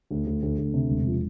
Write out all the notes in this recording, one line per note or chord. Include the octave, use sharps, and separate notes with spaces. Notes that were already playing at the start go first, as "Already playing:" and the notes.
D2
D2
D2
D2
C3
E1
F3